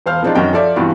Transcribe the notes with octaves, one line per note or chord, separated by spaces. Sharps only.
E1 C5 F5 F6
F3 G#3 C4 D4 D#4 F4
F#2 D#3 F#4 D#5 G5
F3 A4 D5 E5
G2 C3 E3 B3 F4 F#4